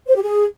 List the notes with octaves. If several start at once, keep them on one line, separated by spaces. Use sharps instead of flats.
C5
G4
G#4